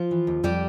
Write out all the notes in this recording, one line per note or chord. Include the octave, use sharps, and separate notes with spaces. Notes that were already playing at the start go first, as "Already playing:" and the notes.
Already playing: F3 F4
E3
D#2
F2 G3 G4